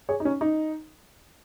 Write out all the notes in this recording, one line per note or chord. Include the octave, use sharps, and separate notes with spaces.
G#4 C#5
D#4
C#4
D#4